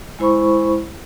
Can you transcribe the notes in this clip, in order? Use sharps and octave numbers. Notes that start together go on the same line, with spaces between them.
G#3 E4 C5 B5 C#6